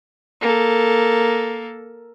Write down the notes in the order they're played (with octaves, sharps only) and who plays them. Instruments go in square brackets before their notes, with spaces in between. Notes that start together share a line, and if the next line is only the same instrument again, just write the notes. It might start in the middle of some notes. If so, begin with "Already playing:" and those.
[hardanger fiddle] A#3 A4